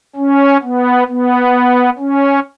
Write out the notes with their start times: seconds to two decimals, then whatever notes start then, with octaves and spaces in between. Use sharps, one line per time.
0.16 C#4
0.62 B3
1.08 B3
1.98 C#4